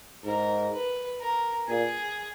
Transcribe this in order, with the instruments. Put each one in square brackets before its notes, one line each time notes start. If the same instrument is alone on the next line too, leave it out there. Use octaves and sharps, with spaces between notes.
[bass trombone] G#2 [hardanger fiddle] A#4
[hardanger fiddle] B4
A#4
[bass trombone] A#2 [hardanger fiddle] G#4